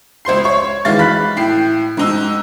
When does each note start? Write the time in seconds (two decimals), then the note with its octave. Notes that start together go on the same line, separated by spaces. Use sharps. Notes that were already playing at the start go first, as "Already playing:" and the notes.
0.25 C#2 C5 C6 C7
0.44 C#5 C#6
0.85 D#3 E3 G#3 F5 A6
0.99 B5 F#6 B6
1.37 A2 G5 C7
1.97 G#2 D#4 E6